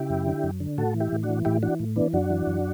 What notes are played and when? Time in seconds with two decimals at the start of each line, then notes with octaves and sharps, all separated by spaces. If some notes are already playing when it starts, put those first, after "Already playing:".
Already playing: C#3 E4 G4
0.10 F#2
0.27 D3
0.44 F#2
0.60 D3
0.78 A2 F#4 A4
0.94 E3
1.00 E4 G4
1.12 A2
1.23 D4 F#4
1.29 E3
1.45 A2 E4 G4
1.62 E3 D4 F#4
1.80 A2
1.96 E3 B3 D4
2.13 F#2 D4 F#4
2.30 E3
2.47 F#2